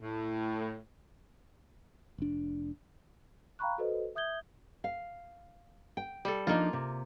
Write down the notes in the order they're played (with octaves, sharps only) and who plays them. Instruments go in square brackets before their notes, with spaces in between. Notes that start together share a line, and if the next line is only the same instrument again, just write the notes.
[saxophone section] A2
[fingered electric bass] F1 D4
[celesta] F5 G5 A#5 B5 C#6 F#6
F#4 A4 B4 C5 D#5
E5 D#6 G6 G#6 G7
[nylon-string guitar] F5
G5
[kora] G3 A4
[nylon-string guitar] F3 D4 D#4 [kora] A#3 F4
[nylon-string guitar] C3